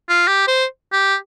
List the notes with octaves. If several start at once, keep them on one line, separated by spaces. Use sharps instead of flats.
F4
G4
C5
G4